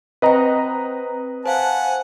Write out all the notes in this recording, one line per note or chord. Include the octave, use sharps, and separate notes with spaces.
C4 B4 C5 D#5 G5 A#5
C5 F5 F#5 G#5 A5